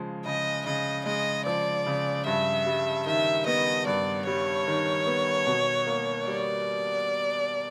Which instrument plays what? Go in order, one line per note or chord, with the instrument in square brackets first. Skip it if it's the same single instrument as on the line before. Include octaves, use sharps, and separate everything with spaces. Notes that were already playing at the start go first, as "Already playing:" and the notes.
Already playing: [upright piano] C#3 F3 G#3
[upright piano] C#3 [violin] D#5
[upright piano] C#3 [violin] D#5
[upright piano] G#3 [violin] D#5
[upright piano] F3 [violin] D5
[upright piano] C#3
[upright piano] G2 [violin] E5
[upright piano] G3
[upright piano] D#3 [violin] E5
[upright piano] B3 [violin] D#5
[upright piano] G2 [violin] D5
[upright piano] G3 [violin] C#5
[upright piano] D#3
B3
B2
A#3
[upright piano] G3 [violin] D5